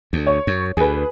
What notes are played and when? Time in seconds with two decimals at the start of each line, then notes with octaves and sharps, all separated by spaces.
0.13 D2
0.27 C#5
0.47 F#2
0.77 D2 G#4 B4